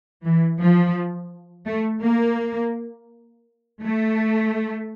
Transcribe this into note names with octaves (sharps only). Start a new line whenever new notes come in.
E3
F3
A3
A#3
A3